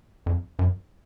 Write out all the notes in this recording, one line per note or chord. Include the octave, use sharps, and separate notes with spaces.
F2
F#2